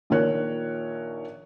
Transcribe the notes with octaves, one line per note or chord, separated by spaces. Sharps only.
A#1 A#2 D#3 A#4 C#5 F#6